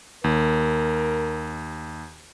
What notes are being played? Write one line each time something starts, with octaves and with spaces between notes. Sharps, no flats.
D#2 A#4